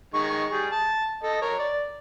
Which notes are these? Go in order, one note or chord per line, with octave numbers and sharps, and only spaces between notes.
D#3 G#3 C#6
G3 G#4
A5
A4 D#5
A#4 C#5
D5